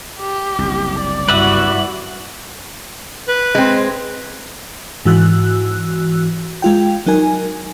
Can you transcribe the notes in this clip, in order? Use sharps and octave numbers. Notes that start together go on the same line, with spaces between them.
G4
F#1 C2
D5
G2 E4 F#4 B4 E5 F#5
B4
G#3 C4
G#2 E3 F#4 E6 F#6
G#3 F4 G5
F#3 D#4 A#4 G#5